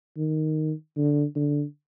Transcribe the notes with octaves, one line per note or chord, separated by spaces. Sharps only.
D#3
D3
D3